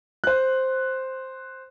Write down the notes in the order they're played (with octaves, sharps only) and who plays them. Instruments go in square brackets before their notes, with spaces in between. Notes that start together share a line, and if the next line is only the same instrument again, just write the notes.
[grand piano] C5 F#6